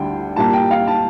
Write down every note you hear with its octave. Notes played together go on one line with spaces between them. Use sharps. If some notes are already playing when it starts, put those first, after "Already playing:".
Already playing: D2 D3 G3 G5
A#2 G3 A#3 A5
G5
F5
A5